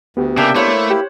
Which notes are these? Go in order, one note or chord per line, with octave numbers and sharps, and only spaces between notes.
D2 B3 G4
C#3 A#3 D4 E5 G5
A3 A#3 E4 C5 C#5 F#5
G4